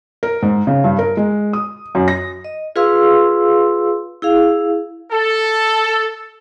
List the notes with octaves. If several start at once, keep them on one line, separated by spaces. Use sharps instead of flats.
A#4
G#2
C#3
G2
A#4
G#3
D#6
F#2
A#6
D#5
F4 G#4 B4 F5 C6 E6
E4 G#4 F5
A4